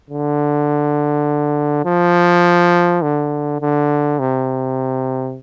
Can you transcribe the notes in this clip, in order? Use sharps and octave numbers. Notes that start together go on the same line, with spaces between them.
D3
F3
D3
D3
C3